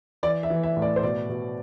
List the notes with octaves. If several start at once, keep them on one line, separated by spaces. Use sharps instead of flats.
E3 D5
E5
E3
E5
A2
D5
C5
B2 D5
B2